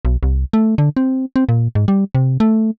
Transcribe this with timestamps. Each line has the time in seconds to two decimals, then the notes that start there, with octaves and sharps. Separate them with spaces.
0.05 B1
0.23 C2
0.53 A3
0.78 D3
0.97 C4
1.36 C4
1.49 A#2
1.75 G#2
1.88 G3
2.15 C3
2.40 A3